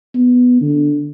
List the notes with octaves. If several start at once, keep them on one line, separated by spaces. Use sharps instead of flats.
B3
D3